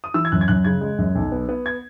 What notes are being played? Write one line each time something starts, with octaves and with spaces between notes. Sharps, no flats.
D#6
E3 E6
G#6
F#2 F#6
G#6
F#2 F#6
C#3 G#6
G#3
F#2
B1
B3
B3
G#6